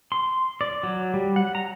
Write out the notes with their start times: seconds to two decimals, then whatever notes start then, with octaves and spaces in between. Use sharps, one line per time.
0.12 C6
0.61 D5
0.83 F#3
1.14 G3
1.36 F#5
1.55 A#5